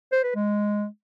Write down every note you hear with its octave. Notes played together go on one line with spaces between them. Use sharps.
C5
B4
G#3